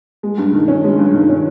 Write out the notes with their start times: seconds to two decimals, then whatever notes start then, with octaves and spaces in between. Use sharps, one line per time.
0.23 G#3
0.38 G2
0.53 D#3
0.68 C#4
0.84 G#3
0.99 G2
1.14 D#3
1.29 C#4